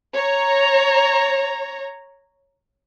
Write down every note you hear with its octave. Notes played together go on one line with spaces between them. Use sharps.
C#5 A#5